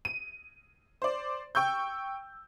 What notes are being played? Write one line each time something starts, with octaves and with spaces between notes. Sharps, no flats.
D#7
C5 D5
G5 C#6 E6 G6